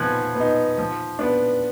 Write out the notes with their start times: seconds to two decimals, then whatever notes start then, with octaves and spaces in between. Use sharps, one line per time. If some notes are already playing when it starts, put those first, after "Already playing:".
Already playing: F3 B3 F#6 G#6
0.35 B3 D#4
0.78 F3
1.19 B3 D4